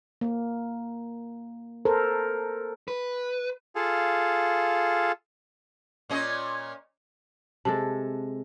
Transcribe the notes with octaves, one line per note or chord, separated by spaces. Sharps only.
A#3
A4 A#4 C5
B4
F4 G#4 A4 F5
A#2 C#4 D#5
C3 G#3 A4 A5